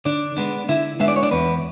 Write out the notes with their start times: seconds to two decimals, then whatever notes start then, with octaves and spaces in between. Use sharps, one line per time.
0.05 D3 D4 D5
0.37 G#3 B3 D4
0.69 D3 E4 E5
1.00 G#3 B3 D4 E5
1.08 D5
1.16 C#5
1.23 D4 D5
1.31 E2 B3 B4